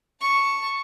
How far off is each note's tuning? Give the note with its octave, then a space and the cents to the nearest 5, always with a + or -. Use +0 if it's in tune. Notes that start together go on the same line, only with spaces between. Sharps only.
A5 +15 C#6 +0